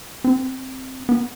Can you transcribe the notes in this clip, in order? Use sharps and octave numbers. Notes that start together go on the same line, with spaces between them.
C4
B3